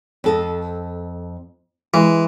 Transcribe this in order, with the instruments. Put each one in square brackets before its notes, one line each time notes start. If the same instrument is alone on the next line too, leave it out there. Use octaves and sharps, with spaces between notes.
[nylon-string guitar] F2 A4 D#5
[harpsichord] E3 [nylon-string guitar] G#3